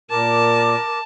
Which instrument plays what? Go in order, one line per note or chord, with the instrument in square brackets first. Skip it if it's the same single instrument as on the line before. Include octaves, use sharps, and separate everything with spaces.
[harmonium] A#2 [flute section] A#4 D6 [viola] A5